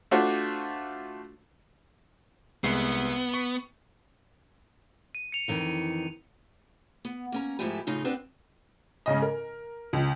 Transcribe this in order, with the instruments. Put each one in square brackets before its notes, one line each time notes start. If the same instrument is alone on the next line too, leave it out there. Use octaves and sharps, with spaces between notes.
[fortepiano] A3 D4 F4 F#4 C5
[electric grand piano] C2 G#3 C7 [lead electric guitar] B3
[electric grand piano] C#6
[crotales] D#7
C#7 F7
[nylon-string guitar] F2 D#3 E3
[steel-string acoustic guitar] B3
A#3 C#4 A#5
G#2 F3 A3 E4 G4 G#5
A2 C#3 D#4 F4
B3 C4 D4 G4 B4 C5
[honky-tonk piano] G#2 C#3 D#5
A#4
C#2